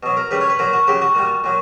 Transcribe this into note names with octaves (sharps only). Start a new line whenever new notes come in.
B2 F#3
A#4
C#3 G3 B4
C#5
B4
A#2 F#3 A#4
F#4
C#3 F#3 G4
F#4
A#2 G3
A#2 F#3